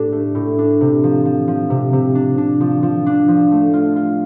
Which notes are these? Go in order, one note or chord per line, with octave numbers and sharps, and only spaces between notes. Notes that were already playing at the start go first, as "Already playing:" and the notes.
Already playing: A2 D4 G4
A3
A2
D4
C3
F3
F3
F3
C3
C3
D4
D4
F3
F3
D4
F3
A3
F4
F4